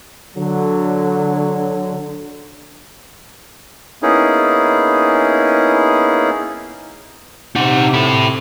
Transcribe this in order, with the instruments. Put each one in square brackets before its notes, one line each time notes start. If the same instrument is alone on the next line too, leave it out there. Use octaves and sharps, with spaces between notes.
[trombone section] D3 F#3
[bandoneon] A#3 B3 C#4 D#4 E4 G#4
[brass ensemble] C3 [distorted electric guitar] D#4 F#5
[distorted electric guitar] E4 A4